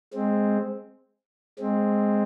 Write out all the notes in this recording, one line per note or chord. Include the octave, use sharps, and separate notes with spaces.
G#3 C4
G#3 C4